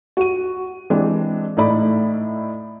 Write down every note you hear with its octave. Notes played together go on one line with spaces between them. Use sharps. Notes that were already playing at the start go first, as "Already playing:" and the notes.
F#4 D#7
E3 G#3 C4 D4 G4
A2 A3 D#4 E4 D5 B5